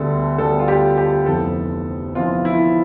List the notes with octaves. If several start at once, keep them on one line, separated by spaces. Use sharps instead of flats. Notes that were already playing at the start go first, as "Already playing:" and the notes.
Already playing: D2 D3 G3 B3 A4
D2 D3 G3 B3 A4
F4
G4
G4
F1 F2 E3 B3 A4
F1 F2 E3 B3 F4
E4